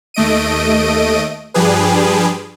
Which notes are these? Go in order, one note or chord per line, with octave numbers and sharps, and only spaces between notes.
D#2 A3 D#5 D7 D#7
G2 F3 D4 G4 G#4 B4